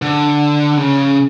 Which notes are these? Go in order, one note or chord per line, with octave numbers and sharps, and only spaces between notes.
D3
C#3